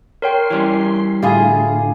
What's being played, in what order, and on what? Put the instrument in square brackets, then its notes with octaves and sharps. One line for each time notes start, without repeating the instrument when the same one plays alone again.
[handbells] A#4 C#5 G5 [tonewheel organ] C6
[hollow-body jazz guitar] E3 G3 C#4
[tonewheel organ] A2 D3 [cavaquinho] E4 F4 G#4 [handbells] G4 G#5